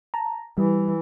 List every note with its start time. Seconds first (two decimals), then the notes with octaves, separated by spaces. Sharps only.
0.14 A5 A#5
0.58 E3 G3